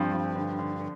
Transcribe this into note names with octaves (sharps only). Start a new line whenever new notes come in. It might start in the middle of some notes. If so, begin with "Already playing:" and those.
Already playing: G2 F3 C4
F3
D3
D3